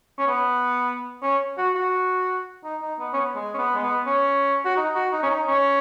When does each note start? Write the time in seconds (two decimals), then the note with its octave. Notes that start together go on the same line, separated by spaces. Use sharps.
0.18 C#4
0.27 B3
1.22 C#4
1.57 F#4
1.75 F#4
2.64 D#4
2.81 D#4
2.99 B3
3.13 C#4
3.17 B3
3.35 G#3
3.54 C#4
3.58 B3
3.75 G#3
3.83 B3
4.06 C#4
4.65 F#4
4.77 D#4
4.95 F#4
5.12 D#4
5.23 C#4
5.30 D#4
5.48 C#4